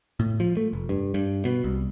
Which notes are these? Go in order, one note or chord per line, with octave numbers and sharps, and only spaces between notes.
A2
F3
A3
F1
G2
G2
B2
C2